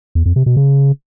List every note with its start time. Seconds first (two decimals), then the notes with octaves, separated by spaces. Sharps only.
0.15 E2
0.26 F2
0.36 C3
0.46 B2
0.57 C#3